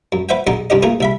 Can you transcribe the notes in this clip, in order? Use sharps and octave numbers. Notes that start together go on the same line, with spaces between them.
F#2
B4 C5 E5 F#5 G5
B1 D3 G#3 D#4 D#5 C6
C2 G2 C#4 G4 D#5
A3 A#3 F4 G#4 A4
C2 E5 B5